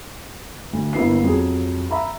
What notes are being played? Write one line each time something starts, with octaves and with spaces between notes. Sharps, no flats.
D2
G1 A#3 E4 B4 C7
F2 F#3 G#4
E5 A#5 B5